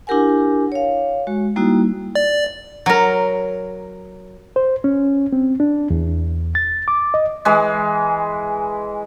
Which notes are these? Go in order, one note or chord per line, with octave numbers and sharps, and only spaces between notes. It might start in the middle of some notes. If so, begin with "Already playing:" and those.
D4 E4 G4 A#4 F#5 G#5
C#5 F5
G#3 F#4
G3 A#3 D#4 E4 F#4
D5
F#3 A#4
C5
C#4
C4
D4
E2
A6
D6
D#5
E3 G#3